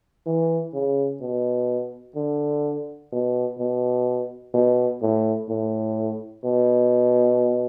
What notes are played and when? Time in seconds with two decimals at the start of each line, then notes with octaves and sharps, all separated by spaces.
0.26 E3
0.74 C#3
1.21 B2
2.16 D3
3.12 B2
3.59 B2
4.54 B2
5.02 A2
5.49 A2
6.45 B2